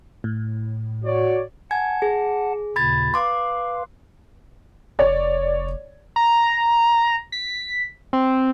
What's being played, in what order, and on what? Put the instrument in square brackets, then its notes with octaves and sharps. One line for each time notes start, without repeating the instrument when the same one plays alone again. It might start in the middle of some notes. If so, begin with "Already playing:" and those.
[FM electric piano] A2
[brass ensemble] F#4 C#5 D5
[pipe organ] F#5 A5 [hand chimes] G#5 G#6
[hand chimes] G#4
[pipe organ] D#2 A#2 C#3 [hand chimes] B5 G#6 A6
[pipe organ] B4 F5 [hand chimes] C6 D6
[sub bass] F1 [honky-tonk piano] C#5 D5
[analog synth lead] A#5
B6
C4